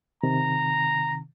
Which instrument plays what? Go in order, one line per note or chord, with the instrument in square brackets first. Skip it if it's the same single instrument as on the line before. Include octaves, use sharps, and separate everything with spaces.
[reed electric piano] C3 D#3 [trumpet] A#5